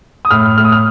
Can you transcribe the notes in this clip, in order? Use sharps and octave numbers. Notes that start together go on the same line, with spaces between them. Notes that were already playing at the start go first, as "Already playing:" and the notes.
D#6
A2 F6
A2 F6
D#6
F6